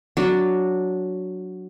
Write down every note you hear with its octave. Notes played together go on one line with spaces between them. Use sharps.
F#3 D4